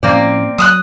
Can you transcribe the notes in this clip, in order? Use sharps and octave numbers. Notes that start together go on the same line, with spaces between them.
A2 F3 A#3 C4 C#4 D5
F#3 D#6 E6 F#6